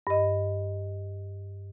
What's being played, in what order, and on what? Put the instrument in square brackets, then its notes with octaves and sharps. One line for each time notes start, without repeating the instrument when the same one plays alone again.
[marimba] G2 D#5